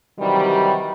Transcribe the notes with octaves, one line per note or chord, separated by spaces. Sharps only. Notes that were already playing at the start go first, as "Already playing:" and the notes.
C3 D#3 E3 F#3 G3